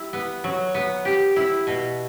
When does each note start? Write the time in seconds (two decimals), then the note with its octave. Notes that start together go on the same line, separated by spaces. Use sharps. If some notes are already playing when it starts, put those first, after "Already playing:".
Already playing: G3 E4
0.13 B3
0.44 F#3
0.75 B3
1.05 G4
1.36 E4
1.67 B2